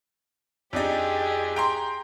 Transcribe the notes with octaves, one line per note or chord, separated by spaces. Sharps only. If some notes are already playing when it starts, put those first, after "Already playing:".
F2 D4 D#4 G4 G#4
G5 A#5 C6